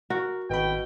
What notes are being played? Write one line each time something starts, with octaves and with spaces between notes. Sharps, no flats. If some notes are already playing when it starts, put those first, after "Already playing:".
F#4 A#4
G#1 B2 G5 B5